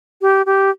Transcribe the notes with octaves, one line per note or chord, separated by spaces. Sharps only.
G4
G4